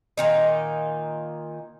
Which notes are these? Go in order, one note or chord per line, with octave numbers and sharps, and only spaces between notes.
A#2 D#3 D#4